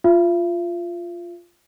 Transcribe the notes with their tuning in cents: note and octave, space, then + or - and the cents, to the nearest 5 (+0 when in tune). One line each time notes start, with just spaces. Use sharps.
F4 +0 E5 +45